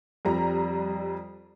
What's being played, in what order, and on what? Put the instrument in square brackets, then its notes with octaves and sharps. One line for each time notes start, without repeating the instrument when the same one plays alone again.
[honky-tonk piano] F2 G3 A#5